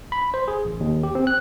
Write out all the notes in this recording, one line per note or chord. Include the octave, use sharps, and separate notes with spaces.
B5
C5
G#4
A1
D#2
G4
C4
F#6